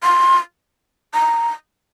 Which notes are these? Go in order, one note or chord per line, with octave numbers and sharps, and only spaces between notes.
C6
A#5